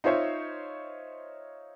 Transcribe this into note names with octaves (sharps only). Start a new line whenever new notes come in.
D#4 F4 C5 C#5 E5